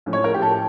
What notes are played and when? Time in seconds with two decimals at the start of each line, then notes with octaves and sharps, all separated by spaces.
0.06 A2 F3 C#4
0.13 C#5
0.24 A#4
0.34 G4
0.42 A4